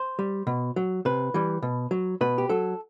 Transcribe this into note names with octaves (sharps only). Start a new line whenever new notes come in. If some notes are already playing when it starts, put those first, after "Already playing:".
Already playing: C5
G3
B2
F#3
C3 B4
E3 G3
B2
F#3
B2 B4
G4
F#3 A4